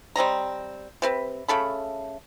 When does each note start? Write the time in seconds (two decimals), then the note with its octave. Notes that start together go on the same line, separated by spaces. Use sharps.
0.16 G3 C4 D#5 A#5
1.02 C3 C4 B4
1.48 C#3 A3 A4 B5